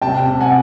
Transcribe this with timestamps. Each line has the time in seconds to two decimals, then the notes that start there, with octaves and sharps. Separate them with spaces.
0.01 C3 G5 A5
0.28 C3
0.41 F#5 G#5